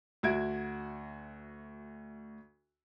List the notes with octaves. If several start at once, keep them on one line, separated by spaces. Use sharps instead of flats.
D2 F#4 E5 G#6 D7